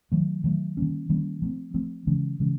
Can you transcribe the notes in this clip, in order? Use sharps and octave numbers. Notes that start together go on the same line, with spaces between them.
D#3 F#3 A3
D#3 F#3 A3
D#3 G3 A#3 C#4
D#3 G3 A#3 C#4
F3 A3 C4
F3 A3 C4
C#3 E3 G#3 C#4
C#3 E3 G#3 C#4